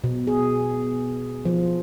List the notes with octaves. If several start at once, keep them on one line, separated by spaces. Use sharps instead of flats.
B2
G#4
F3